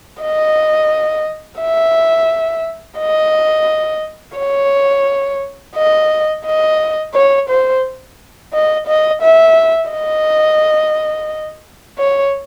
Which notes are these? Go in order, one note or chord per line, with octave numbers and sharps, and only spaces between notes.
D#5
E5
D#5
C#5
D#5
D#5
C#5
C5
D#5
D#5
E5
D#5
C#5